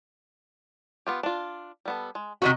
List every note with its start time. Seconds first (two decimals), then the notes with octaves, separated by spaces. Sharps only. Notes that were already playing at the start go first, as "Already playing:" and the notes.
1.07 B3 F4 G4
1.23 D4 F4
1.85 G3 B3 A4
2.15 G#3
2.42 C3 D#3 F#4 A#4 C5 D#5